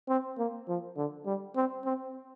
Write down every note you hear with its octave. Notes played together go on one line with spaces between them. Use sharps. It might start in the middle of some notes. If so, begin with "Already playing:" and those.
C4
A#3
F3
D3
G3
C4
C4